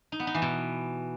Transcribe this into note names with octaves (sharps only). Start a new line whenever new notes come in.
D#4
B3
D#4
E3
B2